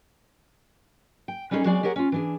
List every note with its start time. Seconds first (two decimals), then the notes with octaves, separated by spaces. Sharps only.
1.28 G5
1.51 G3 C#4 D#4 F#4 G#4 A4
1.65 F#3 G#3 C4 G#4 D5
1.83 G4 G#4 A#4 C#5 F#5
1.96 C#4 F4
2.12 E3 D4 G#4